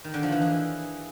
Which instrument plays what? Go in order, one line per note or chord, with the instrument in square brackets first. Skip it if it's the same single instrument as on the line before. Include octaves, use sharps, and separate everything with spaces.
[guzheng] D#3
D3
F3
E3
G#4